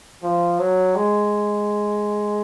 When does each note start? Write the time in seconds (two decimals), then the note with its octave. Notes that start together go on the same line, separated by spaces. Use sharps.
0.23 F3
0.59 F#3
0.95 G#3